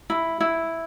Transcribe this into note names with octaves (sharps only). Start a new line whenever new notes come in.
E4
E4